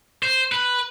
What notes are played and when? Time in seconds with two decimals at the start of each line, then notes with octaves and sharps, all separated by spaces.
0.23 C5
0.52 B4